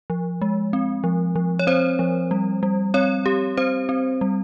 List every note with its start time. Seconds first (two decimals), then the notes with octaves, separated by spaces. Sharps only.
0.10 F3
0.42 G#3
0.73 C4
1.04 F3
1.36 F3
1.59 C#5
1.67 C4 C5
1.99 F3
2.31 G3
2.63 G3
2.94 C4 C#5
3.26 C4 G4
3.57 C4 C5
3.89 C4
4.21 G3